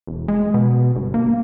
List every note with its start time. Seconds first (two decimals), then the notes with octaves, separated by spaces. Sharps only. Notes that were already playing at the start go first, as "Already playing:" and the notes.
0.07 E1
0.28 G#3
0.54 B2
0.96 G1
1.14 A#3